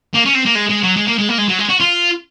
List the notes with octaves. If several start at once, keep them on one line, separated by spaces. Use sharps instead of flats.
A#3
C#4
C4
A#3
G#3
G#3
F#3
G#3
A#3
G#3
A#3
G#3
F#3
G#3
F#4
F4